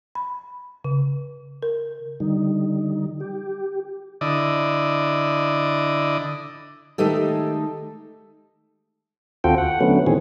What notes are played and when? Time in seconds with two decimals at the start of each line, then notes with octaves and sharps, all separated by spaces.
0.15 B5
0.84 C#3
1.63 A#4
2.20 D3 G3 D#4
3.20 G4
4.21 D3 E4 D5 D#5
6.98 D#3 G#3 A3 D#4 G4 A4
9.44 D#2 C4 F4 F#4 A4 G5
9.58 F#5
9.81 D3 F#3 A3 B3 C#4
10.07 A#2 D#3 E3 C4 G#4